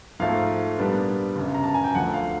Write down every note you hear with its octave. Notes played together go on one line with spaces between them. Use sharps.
G#2 F3 A3 F5
A#2 G3 B3 D4
G1 F#2 C#3
A#5
A5
G#5
G5
D2 D3 F3 A3 F#5
F5